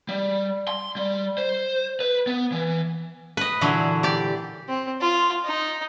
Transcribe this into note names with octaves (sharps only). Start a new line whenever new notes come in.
G3
C6
G3
C5
B4
B3
E3
B4 D#5
A#2 D3 E3 F#3
G4 D5
C4
F4
D#4